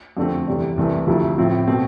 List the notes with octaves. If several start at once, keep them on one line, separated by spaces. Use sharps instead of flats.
F2 D3 A3 C4
E2 C3 G3
C2 C3 E3 A3
D2 C3 F3 A3 E4
A2 F3 C4 E4
B2 A3 C4